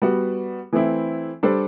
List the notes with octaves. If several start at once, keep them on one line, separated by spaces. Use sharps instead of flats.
G3 B3 F#4
E3 A3 C4 E4
G3 D4 A4 C5